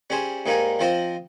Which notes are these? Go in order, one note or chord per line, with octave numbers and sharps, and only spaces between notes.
G3 C#4 G#4 C5
G#2 G3 A#3 D#4 G#4
F3 C4 F4 C5 D#5